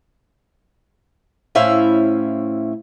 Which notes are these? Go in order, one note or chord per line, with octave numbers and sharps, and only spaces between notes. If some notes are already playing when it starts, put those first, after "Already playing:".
A2 C#4 E4 C5 E5 F5